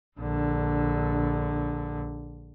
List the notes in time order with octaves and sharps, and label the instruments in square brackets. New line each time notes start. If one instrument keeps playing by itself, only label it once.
[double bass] A#1 D3